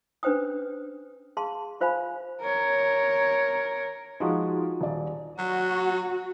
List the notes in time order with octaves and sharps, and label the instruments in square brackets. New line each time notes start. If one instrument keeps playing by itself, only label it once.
[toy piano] C#4 D4 B4 C5 G5 D#6
G#4 F5 A5 C6
F4 C5 F5 G#5 B5
[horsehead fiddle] A#4 C#5
[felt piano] F3 G#3 [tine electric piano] D#4 F4 F#4
[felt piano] D#1 D5
[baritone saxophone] F#3 [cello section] F#4